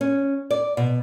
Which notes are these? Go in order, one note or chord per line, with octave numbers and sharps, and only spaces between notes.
C#4
D5
B2